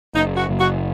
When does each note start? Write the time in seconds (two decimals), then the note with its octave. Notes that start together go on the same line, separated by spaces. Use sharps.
0.15 F#1 D#4
0.37 F#4
0.49 F#1
0.60 F#4